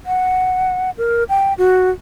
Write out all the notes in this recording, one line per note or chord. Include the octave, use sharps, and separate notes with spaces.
F#5
A#4
G5
F#4